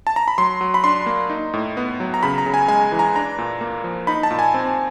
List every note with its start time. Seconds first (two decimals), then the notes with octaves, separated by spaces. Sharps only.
0.07 A5
0.16 A#5
0.28 B5
0.38 F#3 C6
0.61 F#3
0.74 B5
0.84 D4 C6
1.06 A#3
1.30 D#4
1.54 A2
1.77 B3
2.00 F#3
2.14 A#5
2.23 C#3 B5
2.38 A#5
2.46 C#3
2.54 G#5
2.68 G#3 G#5
2.92 E3
2.99 A#5
3.15 D4 A#5
3.38 A#2
3.61 A#3
3.84 F3
4.07 D#4 B5
4.23 A5
4.31 A#2
4.39 G#5
4.54 C4